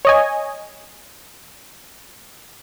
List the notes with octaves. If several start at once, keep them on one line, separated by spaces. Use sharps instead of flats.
C#5 D#5 G#5